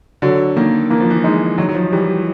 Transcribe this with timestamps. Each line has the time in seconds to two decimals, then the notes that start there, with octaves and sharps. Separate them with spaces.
0.22 D3 F#3
0.56 D#3 A#3
0.90 E3 A#3
1.00 F3
1.10 E3
1.24 G#3 D#4
1.58 D#3 F#3
1.69 F#3
1.75 F3
1.92 E3 G3